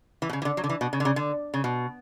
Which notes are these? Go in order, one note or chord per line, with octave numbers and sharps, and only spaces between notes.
E3
B2
C#3
E3
D3
F#3
D3
E3
B2
C#3
D3
C#3
D3
C#3
B2